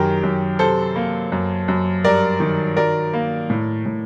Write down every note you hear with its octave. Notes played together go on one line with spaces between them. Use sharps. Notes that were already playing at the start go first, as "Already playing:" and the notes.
Already playing: F#2 D#3 G4 A#4
F#2
C3 A4 C5
A#3
F#2
F#2
G2 A#4 D5
D#3
F#3 A#4 D5
A#3
A2
A2